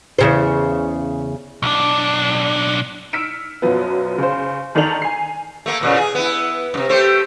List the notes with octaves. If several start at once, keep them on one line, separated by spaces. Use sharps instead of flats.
E2 C#3 C5
B1 D4
E6 F6 B6 C#7 D7 E7
F#2 B2 F3 F#3 B3
C#3 C5
E2 D#3 D4 A4 F7 F#7
G#5 C7
A3 A#3
E2 A#2 C#3
G#4
B3 E4
G2 C3
A3 G4 C5